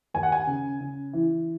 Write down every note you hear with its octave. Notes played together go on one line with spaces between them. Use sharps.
D#2 G#5
F#5
G#5
C#3
C#3
E3